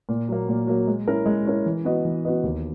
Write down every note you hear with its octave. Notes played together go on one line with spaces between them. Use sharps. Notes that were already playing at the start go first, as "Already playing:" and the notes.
A#2
F#3 A#3
A#2
F#3 A#3
G#3
C#4 E4 A#4
G#3
C#4 E4 A#4
E3
B3 F#4 B4 D#5
E3
B3 F#4 B4 D#5
D#2